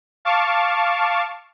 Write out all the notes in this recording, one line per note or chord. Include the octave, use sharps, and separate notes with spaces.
F5 A5 C#6 D6